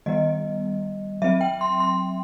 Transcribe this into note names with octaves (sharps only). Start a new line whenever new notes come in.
D#3 G3 B3 D#5
F#3 C4 E5
G5
C6
C6